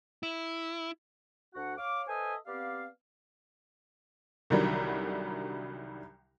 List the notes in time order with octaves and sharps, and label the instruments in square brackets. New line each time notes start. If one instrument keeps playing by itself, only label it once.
[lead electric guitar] E4
[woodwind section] D2 D4 F#4 F#5
C#5 F5 D6
A4 B4 C5 D#5 E5 G#5
B3 C4 G4 D5 F5
[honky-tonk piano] C2 D3 D#3 F#3 G3